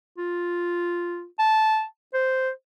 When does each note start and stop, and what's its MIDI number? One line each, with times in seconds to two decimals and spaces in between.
0.18 1.25 65
1.39 1.84 81
2.14 2.50 72